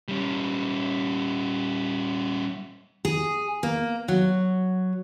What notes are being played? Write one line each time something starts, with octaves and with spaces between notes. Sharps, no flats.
G3 C#4
G#4
A#3
F#3